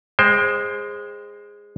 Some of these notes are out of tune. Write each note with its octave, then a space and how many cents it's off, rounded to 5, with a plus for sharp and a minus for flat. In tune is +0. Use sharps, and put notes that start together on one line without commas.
G#3 -10 C5 +10 G5 +15